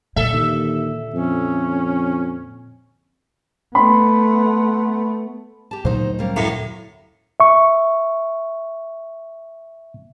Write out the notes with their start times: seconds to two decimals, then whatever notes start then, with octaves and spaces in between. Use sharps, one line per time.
0.16 A#2 D3 A4 E5
0.32 D#2
1.14 F2 C#4
3.75 A3 B3 B5 C6
5.71 G4 A5
5.85 D2 A#2 F#3 D#4 C5
6.19 G3 A#3 C#4
6.36 F#2 A2
7.40 E5 C#6